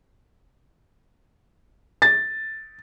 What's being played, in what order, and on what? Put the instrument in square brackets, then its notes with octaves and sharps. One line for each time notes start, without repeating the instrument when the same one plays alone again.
[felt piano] A6